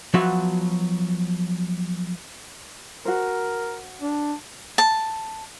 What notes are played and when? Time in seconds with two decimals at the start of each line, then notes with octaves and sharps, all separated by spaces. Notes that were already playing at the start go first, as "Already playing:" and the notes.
0.14 F3 F#3 B3 F#4 E5
3.05 F#4 A#4 C5
4.01 D4
4.78 A5